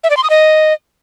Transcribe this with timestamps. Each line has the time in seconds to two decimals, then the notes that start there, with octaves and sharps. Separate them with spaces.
0.04 E5
0.10 D5
0.17 C6
0.23 D#6
0.30 D#5